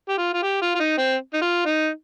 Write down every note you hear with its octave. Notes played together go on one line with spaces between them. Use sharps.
G4
F4
F4
G4
F4
F4
D#4
C4
D#4
F4
D#4